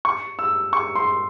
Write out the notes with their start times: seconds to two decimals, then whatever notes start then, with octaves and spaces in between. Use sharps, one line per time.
0.05 C#6
0.39 E6
0.73 C#6
0.95 C6